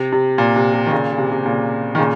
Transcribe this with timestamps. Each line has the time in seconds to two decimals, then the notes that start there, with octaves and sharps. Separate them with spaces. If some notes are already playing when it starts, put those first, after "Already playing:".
Already playing: C3
0.13 C3
0.38 A#2
0.56 C3
0.74 C3
0.87 D#3
0.92 A#2 C#3
1.13 C#3
1.18 C3
1.32 C3
1.45 A#2 C#3
1.95 D#3
1.98 A#2 C#3